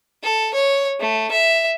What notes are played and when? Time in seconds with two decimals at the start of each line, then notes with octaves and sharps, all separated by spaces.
0.23 A4
0.53 C#5
1.00 A3
1.31 E5